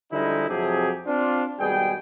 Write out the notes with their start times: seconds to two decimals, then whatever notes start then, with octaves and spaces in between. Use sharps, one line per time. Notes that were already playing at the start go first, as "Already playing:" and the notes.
0.13 D3 F3 G3 G#3 D#4 E4
0.49 F2 C3 F#3 A3 G4 G#4
1.07 C4 D4 F4
1.60 G#1 B2 G3 G#4 G5